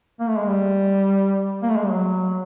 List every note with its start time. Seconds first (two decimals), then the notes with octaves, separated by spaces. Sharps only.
0.20 A#3
0.29 A3
0.38 G#3
0.47 G3
1.62 A#3
1.69 A3
1.77 G#3
1.83 G3
1.91 F#3